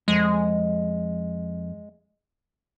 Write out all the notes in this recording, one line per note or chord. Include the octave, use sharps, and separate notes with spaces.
F2 G#3